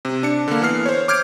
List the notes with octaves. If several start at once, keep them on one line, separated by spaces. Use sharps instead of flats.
C3
D4 C#7
D3 A#3
E3 B3 F6 C7
C5 C#5
D6 F6 G6 G#6 D7